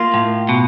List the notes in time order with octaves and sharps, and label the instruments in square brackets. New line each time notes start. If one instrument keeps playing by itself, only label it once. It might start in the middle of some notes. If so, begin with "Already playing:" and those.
Already playing: [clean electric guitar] A#3 [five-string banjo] F4
[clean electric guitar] A2
B2